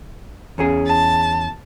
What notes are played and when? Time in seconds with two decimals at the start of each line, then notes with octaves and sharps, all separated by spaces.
0.58 E2 C#4 G#4
0.87 A5